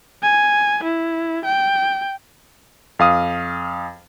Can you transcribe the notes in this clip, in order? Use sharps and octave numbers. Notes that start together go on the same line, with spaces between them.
G#5
E4
G5
F2 F5 D#6